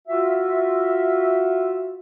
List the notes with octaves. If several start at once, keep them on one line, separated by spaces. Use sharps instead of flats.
F4 F#4 E5